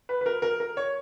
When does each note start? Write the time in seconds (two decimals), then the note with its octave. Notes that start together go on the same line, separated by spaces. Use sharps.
0.09 B4
0.21 B4
0.26 A#4
0.42 A#4
0.60 A#4
0.77 C#5